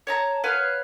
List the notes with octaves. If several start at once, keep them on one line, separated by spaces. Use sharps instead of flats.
C#5 A5 A#5
B4 C#5 F5 F#5